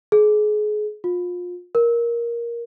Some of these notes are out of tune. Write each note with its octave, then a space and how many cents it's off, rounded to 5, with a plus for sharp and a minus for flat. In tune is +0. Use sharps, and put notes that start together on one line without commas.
G#4 +30
F4 +30
A#4 +10